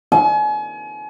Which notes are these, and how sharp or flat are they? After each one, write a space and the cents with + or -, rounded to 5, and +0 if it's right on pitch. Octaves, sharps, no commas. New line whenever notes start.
G#5 +35